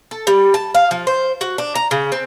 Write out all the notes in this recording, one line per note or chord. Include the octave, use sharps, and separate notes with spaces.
A4
G3
A5
F5
F3
C5
F#4
D4
A#5
C#3
C4